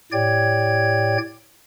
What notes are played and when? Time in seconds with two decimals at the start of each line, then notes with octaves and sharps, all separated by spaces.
0.12 A2 G4 C#5 D5 G5 G#6